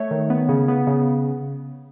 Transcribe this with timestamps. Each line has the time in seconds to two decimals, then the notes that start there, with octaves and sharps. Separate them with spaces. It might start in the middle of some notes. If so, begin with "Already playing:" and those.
Already playing: A3 C#5
0.11 D#3
0.30 B3
0.49 C#3
0.68 B3
0.87 C#3